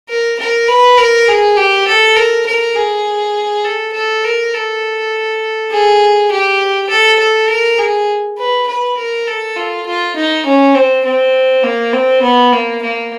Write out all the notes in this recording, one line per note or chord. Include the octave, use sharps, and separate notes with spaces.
A#4
A#4
B4
A#4
G#4
G4
A4
A#4
A#4
G#4
A4
A4
A#4
A4
G#4
G4
A4
A4
A#4
G#4
B4
B4
A#4
A4
F4
F4
D#4
C#4
C4
C4
A#3
C4
B3
A#3
A#3